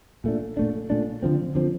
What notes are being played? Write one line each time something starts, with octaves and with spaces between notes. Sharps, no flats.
A#2 A3 D4
A#2 A3 D4
A#2 A3 D4
D3 F3 C4
D3 F3 C4